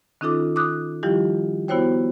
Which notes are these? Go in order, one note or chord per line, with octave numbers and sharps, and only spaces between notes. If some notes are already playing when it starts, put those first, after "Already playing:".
D#3 C#4 D#4 F4 A4 D6
D6 D#6 F#6
D#3 F3 G3 E4 F4 G4
B3 E4 F#4 C5 C#5 G5